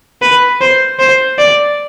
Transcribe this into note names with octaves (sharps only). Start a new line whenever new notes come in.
B4
C5
C5
D5